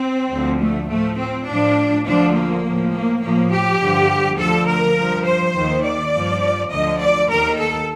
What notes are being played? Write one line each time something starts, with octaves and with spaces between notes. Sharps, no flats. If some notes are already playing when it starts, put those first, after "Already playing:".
Already playing: C4
D2 D3 F3
A3
A2 F3 A3
C4
A2 F3 D4
D2 D3 F3 D4
A#3
A2 F3
A#3
A2 F3 A#3
G4
G2 D3 F3
D2 D3 F3 A4
A#4
G2 F3
C5
D#2 D#3
D5
G2 F3
D2 D3 F3 D#5
D5
D#2 D#3 A#4
A4